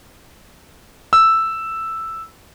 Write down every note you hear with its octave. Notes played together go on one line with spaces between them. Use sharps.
E6